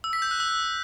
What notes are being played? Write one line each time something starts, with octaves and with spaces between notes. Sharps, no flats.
E6
B6
G6
F#6
E6